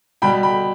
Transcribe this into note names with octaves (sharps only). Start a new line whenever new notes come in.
B2 G3 G5 B5
G5 B5